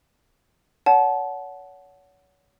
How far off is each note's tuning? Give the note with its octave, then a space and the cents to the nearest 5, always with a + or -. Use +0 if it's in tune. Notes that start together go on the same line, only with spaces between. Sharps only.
C#5 +35 F#5 +0 A5 -25